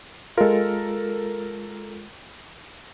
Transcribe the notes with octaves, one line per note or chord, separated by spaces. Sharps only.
G#3 F4 A4 A#4